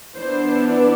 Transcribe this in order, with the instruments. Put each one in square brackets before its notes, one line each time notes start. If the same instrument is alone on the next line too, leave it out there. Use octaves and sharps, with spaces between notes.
[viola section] E3 B3 D4 C5